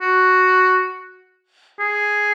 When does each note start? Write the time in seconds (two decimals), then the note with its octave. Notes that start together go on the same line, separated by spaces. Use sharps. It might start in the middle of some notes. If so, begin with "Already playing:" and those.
0.01 F#4
1.80 G#4